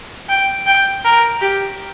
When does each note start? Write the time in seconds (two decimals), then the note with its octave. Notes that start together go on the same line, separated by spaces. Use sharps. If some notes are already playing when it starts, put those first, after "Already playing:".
0.29 G5
0.67 G5
1.04 A#4
1.41 G4